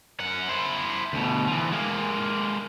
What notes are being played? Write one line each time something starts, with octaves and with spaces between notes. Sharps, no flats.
F#2 F#5
E4 C5
D2 B2
E3 F3
G#3 A#3